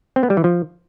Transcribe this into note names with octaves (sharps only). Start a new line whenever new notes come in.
C4
B3
G3
E3
F3